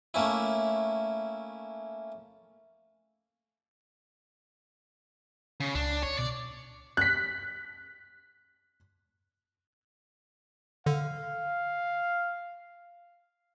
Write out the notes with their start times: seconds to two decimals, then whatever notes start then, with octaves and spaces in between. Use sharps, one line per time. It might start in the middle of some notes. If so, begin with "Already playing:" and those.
0.14 A3 A#3 C#4 E4
5.60 C#3
5.75 C#2 D4
6.03 C#5
6.18 B2 D5
6.97 F#6 B6
10.86 D3 F5